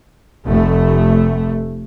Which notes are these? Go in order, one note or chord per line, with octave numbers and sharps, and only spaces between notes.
F1 A3